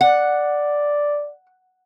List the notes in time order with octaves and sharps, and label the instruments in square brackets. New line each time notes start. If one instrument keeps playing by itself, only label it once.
[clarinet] D5 [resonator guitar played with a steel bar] F#5